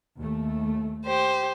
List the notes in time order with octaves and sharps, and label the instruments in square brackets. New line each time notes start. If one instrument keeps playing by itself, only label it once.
[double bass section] D#2 A3
[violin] G4 C5